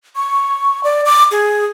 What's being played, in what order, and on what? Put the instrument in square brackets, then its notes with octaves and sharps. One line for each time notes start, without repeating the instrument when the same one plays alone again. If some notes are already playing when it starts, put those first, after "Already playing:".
[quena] C#6
D5
D6
G#4